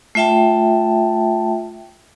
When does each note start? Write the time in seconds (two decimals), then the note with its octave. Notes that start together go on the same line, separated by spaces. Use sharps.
0.15 A3 F4 E5 G5 A5